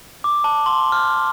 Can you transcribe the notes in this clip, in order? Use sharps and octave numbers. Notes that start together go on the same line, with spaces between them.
D6
A5
C6
F6